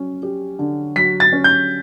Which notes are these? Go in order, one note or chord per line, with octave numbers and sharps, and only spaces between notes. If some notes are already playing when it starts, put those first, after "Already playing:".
Already playing: F#3 C#4
G4
D3
F#3 B6
A6
C#4
G6